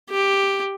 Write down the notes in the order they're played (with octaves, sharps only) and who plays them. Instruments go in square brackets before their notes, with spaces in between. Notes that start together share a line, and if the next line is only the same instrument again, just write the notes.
[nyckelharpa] G4